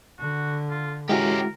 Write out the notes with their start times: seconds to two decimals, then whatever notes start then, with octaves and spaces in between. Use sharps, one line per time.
0.20 D3 F#4
0.70 F4
1.09 G#3 C#4 E4 F#4 G4 A#4